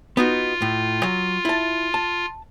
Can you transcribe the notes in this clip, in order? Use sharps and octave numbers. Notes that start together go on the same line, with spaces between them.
B3 D#4 F4 F#4
A2
F#3
E4 A5
A5